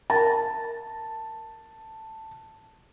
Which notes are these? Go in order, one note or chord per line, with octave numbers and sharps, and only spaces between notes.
A#4 A5 A6